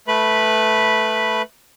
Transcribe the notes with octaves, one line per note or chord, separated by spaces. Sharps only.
A3 B4 B5